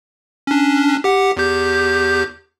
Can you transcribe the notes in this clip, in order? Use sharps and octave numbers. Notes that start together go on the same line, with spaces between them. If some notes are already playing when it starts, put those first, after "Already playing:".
C#4 D4
G4 F#5
E2 G4 G6